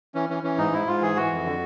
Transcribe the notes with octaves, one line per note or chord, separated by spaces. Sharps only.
E3 C#4
E3 C#4
E3 C#4
G#2 D#4
G#2 E4
G#2 F4
E3 G#4
E3 F#4
F2
D3